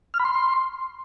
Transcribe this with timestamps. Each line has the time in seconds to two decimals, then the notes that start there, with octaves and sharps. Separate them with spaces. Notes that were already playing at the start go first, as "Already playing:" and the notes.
0.14 F6
0.19 B5
0.25 C6